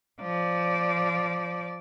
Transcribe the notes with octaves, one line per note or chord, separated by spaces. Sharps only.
F3 D5